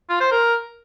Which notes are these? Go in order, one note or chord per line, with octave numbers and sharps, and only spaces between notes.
F4
C5
A#4